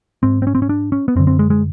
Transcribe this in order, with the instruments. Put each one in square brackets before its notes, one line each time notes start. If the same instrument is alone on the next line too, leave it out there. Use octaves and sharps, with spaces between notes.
[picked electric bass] G#2 C4
C4
C#4
C4
C#4
D4
C#4
B3
F#2 C4
D3
C4
G#3
G#3